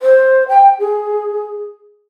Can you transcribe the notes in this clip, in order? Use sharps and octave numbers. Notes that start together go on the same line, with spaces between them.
C5
G5
G#4